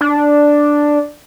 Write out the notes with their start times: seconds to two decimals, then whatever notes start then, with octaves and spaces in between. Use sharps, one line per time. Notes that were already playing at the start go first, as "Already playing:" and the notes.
0.01 D4